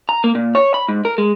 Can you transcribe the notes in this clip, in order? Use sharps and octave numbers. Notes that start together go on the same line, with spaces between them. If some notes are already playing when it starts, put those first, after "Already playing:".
A#5
A#3
A#2
C#5
B5
G#2
A#4
G#3